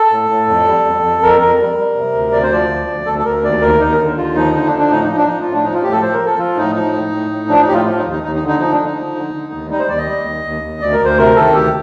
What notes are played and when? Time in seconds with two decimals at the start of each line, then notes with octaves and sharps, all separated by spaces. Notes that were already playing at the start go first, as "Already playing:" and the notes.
Already playing: A4
0.12 A2
0.30 A2
0.49 F2
0.67 G3
0.85 F2
1.03 F2
1.22 F2 A#4
1.41 F2 A#4
1.59 G3
1.78 G3
1.95 C3
2.14 D2
2.32 D2 D5
2.43 C5
2.51 F3 D5
2.70 D2
2.88 D2
3.06 D2 A4
3.19 A4
3.25 D2 A#4
3.44 D#2 D5
3.61 D#2 A#4
3.80 D#2 D#4
3.92 A#4
3.99 D3
4.17 D#2 F4
4.35 F3 D#4
4.54 D3 D#4
4.67 D4
4.73 F3
4.79 D4
4.90 A2 D#4
5.04 D#4
5.09 F3
5.16 D4
5.27 F3 D#4
5.40 F4
5.46 A2
5.53 D4
5.64 F3 D#4
5.74 F4
5.83 A2 G4
5.92 A4
6.01 F3 C5
6.13 A#4
6.19 F3
6.26 A4
6.38 F3 F4
6.56 A2 D#4
6.75 F3 D#4
6.93 A2
7.12 A2
7.31 A2
7.49 F3 D4
7.61 D#4
7.67 A2 G4
7.73 F4
7.85 F3 F4
7.98 D#4
8.04 D#2
8.11 D#4
8.23 D#2 D#4
8.35 D#4
8.41 D3
8.48 D#4
8.59 F3 D#4
8.72 D4
8.78 D3
8.84 D#4
8.97 F3
9.15 D3
9.34 D3
9.52 D#2
9.70 G3 D#4
9.79 C5
9.89 D#2 D5
9.97 D#5
10.07 G3
10.25 D#2
10.44 D#2
10.62 D#2
10.81 D2 D5
10.93 A#4
11.00 D2 C5
11.17 C3 A#4
11.36 D#3 A4
11.54 D2 G4